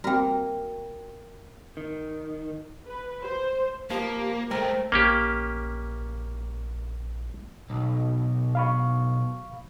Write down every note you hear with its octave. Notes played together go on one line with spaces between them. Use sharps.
G3 A#3 C4 F#4 A#4 G5
D#3
B4
C5
F3 A#3 G4
G#3 A3 A#4 C5 G5
A#1 A#3 C#4 G4
B1
F5 B5 C#6